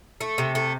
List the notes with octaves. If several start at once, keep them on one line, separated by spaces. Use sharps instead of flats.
A3
C3
A3